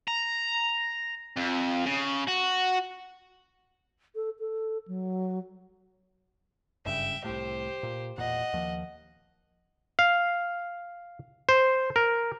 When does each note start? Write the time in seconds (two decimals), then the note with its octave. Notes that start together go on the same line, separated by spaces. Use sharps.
0.08 A#5
1.37 F2
1.85 C#3
2.27 F#4
4.15 A4
4.39 A4
4.88 F#3
6.86 F#1 G2 C#3 E5 G5
7.25 C2 A2 G4 C5
7.83 A#2
8.17 E1 A#2 D#5 F#5
8.53 D#2 F3
9.99 F5
11.49 C5
11.96 A#4